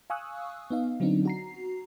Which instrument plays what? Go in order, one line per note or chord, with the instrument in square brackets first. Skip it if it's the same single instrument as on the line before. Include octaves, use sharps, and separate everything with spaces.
[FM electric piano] F5 G#5 C#6 D#6 E6 F#6
B3 D#4 F5
D3 F#3 B3 C4 D4 D#4
F#4 A#5 C7